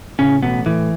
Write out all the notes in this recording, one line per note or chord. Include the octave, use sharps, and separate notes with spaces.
A2 C#3 C#4
A1 B2 B3
A2 E3